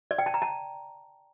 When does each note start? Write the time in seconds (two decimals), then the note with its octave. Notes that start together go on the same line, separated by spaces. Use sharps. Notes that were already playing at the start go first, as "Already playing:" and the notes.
0.11 D5
0.18 G5
0.26 A5
0.34 A#5
0.42 A5